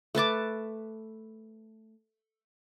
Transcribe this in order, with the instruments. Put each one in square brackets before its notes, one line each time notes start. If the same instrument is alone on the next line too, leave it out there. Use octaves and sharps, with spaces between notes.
[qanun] A3 B4 A5 D6